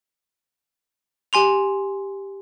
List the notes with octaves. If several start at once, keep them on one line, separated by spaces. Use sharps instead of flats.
G4 G#5 C6 F7